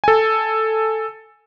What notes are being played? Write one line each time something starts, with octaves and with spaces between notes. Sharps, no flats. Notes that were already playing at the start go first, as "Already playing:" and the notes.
A4 G#5